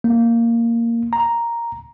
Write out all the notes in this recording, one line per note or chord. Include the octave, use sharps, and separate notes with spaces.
A#3
A#5